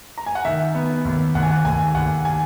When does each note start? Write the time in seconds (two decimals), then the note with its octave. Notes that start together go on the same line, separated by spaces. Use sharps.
0.18 A#5
0.26 G#5
0.35 F#5
0.45 D#3 E5
0.75 B3
1.05 D#2
1.35 D#2 F#5
1.43 G#5
1.51 F#5
1.64 D#2 G#5
1.95 D#2 F#5
2.25 G#5